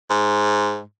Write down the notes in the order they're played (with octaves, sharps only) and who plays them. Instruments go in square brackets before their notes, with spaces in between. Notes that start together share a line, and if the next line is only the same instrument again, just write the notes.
[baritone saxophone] G#2